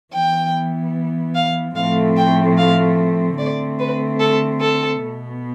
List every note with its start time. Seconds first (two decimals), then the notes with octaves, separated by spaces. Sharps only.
0.13 E3 B3 G5
1.35 F5
1.75 A2 F3 A3 C4 F5
2.17 G5
2.58 F5
3.39 D3 A3 C4 D5
3.79 B4
4.20 A4
4.61 A4
5.02 B2 B3